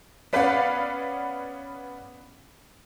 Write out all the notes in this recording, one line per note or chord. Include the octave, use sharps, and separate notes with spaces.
B3 C#4 B4 D5 F5 F#5